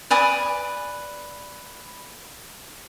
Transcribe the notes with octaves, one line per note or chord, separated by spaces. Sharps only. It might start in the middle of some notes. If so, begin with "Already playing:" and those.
B4 D5 G#5 D#6